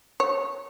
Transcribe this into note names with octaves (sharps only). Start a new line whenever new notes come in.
C#5